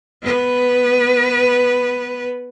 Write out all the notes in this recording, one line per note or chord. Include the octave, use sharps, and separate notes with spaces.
B3 B4